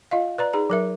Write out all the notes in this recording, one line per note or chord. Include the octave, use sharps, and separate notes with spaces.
F4 D#5 F5
B4 D5 A#5
D#4 G#4 A#5
F#3 A#4 E5